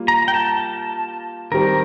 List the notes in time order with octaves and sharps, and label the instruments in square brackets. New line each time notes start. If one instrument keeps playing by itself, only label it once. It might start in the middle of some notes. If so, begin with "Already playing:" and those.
Already playing: [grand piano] G3 A#3 F4
[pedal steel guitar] A#5
G5
A5
[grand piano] D#3 G3 C4 G4 [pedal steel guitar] A#4